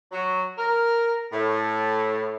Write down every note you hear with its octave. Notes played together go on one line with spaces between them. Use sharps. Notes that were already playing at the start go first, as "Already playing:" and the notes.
F#3
A#4
A2